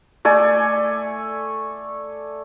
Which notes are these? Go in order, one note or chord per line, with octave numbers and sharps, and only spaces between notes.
A3 D5 G#5